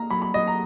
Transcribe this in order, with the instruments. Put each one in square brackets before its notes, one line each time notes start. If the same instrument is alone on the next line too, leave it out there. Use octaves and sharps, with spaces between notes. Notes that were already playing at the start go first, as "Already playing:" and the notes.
Already playing: [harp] A#3 [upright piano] A#5
[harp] F#3 [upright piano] B5
[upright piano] B5
[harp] F#3 [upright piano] D#5
[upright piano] A#5